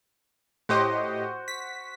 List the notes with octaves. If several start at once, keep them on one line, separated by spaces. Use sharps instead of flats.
A2 F#4 G4 C5 D#5
B6